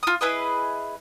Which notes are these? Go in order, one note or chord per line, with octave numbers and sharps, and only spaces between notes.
F4 D#6
E4 G#4 B4 D#5